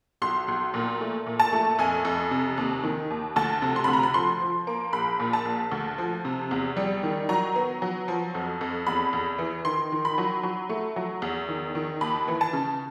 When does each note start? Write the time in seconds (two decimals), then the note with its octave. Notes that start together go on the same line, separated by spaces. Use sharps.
0.22 B1 C6
0.48 B1
0.74 A#2
1.01 A3
1.26 A#2
1.40 A5
1.53 A3
1.79 F2 G#5
2.05 F2
2.31 C3
2.58 D#2
2.83 D#3
3.11 D#2
3.36 D2 A5
3.62 C3
3.76 C6
3.84 D2 B5
3.93 A#5
4.03 B5
4.14 F3 C6
4.42 F3
4.67 A#3
4.93 A#1 B5
5.20 A#2
5.33 A5
5.45 A#1
5.72 D2
5.98 F3
6.25 C3
6.51 E2
6.76 G3
7.03 D#3
7.29 F#3 A#5
7.56 B3
7.82 F#3
8.08 F3
8.35 F2
8.61 F2
8.87 E2 B5
9.13 E2
9.38 E3
9.65 D#3 C6
9.92 D#3
10.05 B5
10.18 F#3
10.43 F#3
10.69 A3
10.96 F#3
11.22 E2
11.49 D#3
11.75 D#3
12.01 D#2 B5
12.28 E3
12.41 A5
12.53 C#3